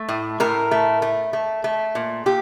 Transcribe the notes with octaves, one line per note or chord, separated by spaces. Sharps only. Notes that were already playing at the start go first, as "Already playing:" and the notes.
Already playing: A3
A2
A2 A#4
A3
A3
A3
A3
A#2
A#2 G4